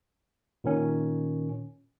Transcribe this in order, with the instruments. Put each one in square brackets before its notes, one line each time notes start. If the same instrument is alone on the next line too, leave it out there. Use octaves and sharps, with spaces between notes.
[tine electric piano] A#2 D#3 C#4